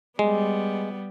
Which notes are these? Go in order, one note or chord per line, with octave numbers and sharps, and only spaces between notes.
G3 G#3 B3